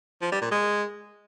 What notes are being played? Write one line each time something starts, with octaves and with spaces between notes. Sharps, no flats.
F3
G3
A#2
G#3